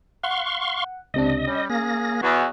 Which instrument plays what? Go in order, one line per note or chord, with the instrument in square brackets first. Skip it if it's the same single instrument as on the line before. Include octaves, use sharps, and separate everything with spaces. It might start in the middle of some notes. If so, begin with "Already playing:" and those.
[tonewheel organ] F5 C6 C#6 [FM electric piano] F#5
[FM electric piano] C#2 C3 D4 [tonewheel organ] D#5
[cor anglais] G3 [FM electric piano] C#4
[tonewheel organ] A#3 A#6 [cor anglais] G#4
[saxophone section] E2 [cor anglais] F#4